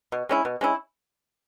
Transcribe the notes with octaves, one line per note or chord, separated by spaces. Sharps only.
B2
G#3 C#4 E4
B2
G#3 C#4 E4